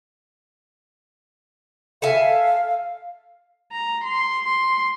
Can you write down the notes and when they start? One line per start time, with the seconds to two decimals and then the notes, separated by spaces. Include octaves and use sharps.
2.02 A4 E5 F5 G#5
3.72 A#5
4.04 C6
4.44 C6